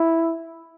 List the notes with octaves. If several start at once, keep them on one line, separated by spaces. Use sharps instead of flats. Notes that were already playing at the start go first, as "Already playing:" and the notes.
Already playing: E4